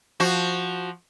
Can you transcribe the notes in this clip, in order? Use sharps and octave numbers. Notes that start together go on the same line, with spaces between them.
F3 F#4